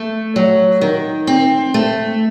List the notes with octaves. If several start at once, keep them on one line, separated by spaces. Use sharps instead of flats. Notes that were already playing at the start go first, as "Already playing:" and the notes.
Already playing: A3
F#3
D#3
C4
A3